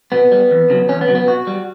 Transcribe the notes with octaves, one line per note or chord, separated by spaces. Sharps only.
B2 B3
G3
E2
C#3 F#3
E2 C#4
B3
C#3 F#3
B3
B2 F#4
G3